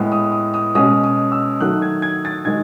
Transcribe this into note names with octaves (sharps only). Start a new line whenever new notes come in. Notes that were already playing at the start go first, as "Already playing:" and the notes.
Already playing: A2 G#3 B3
D#6
D#6
D#6
B2 G#3 C#4 D#6
D#6
E6
D#3 F#3 A3 F#6
G#6
G#6
A6
D#3 G#3 G#6